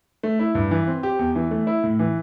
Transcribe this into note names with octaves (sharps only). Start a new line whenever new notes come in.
A3
E4
G2
E3
C4
G4
E2
E3
A3
E4
A2
E3